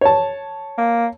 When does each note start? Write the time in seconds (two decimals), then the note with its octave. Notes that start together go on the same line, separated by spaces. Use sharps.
0.01 C#5 A5
0.78 A#3